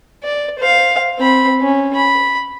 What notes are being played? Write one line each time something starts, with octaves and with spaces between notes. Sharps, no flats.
D5
C5 F5
C4 B5
C#4
B5